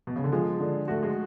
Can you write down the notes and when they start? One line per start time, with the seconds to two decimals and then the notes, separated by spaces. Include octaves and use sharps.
0.07 B2
0.16 C#3
0.24 D3
0.32 F3 G#3
0.60 D3
0.88 A3 F#4
1.03 G#3